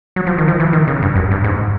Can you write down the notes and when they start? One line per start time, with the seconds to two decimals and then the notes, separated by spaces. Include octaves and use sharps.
0.16 F#3
0.27 F3
0.38 D#3
0.48 F3
0.60 E3
0.73 D#3
0.88 C#3
1.02 G2
1.16 F#2
1.31 G2
1.44 G#2